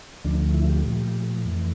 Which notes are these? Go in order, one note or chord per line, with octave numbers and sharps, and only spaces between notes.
D2 D3 F3 A3 D4
E4
G4
A#2 F3 A3
F2 E3 A3